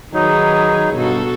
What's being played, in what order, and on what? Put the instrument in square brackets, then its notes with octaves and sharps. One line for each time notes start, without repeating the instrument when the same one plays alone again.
[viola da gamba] D#3 G#4 B4 [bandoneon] F#3 D#4
[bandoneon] G2 [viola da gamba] B2 F#4 A4